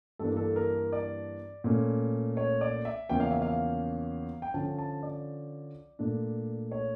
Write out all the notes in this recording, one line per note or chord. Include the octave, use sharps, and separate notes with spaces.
G2 E3 A#3 D4 A4
A4
A#4
D5
A#2 A3 C#4
C#5
D5
E5
E2 C#3 F3 A#3 C#4 G5
F5
E5
F5
G5
D3 F3 C#4 A5
A5
D5
A#2 A3 D4
C#5